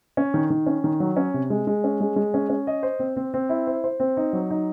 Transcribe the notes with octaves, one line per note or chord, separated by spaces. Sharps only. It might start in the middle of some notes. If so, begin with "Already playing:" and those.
C#4
D#3
D#3
C#4
D#3
F#3
C#4
C3
G#3
G#3
C#4
G#3
G#3
C#4
C#4
D#5
C5
C4
C4
C4
E4
C5
C5
C4
D#4
F#3
D#4